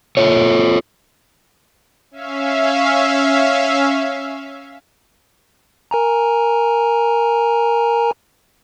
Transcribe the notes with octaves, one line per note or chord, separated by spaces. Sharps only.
F4 A4 C#5
C#4 E5 F5
A#4 G#5 A#5